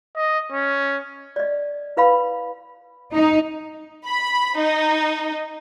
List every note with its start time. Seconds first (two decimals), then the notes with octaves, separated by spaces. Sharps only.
0.16 D#5
0.53 C#4
1.36 D5 D#5
1.97 E4 B4 F5 B5
3.13 D#4
4.05 B5
4.56 D#4